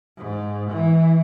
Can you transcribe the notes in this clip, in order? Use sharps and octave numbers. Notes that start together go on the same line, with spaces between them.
G#2
E3